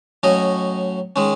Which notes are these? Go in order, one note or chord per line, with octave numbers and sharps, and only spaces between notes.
A2 F#3 C#4 D#5
D#3 G#3 C#4